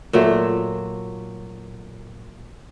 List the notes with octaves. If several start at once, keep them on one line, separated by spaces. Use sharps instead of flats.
A#2 F#3 A3